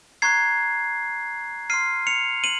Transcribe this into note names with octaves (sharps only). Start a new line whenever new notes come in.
A#5 C#6 F#6 G#6 C7
C6 F6 C7 D#7
C#7 F7
D#7 F#7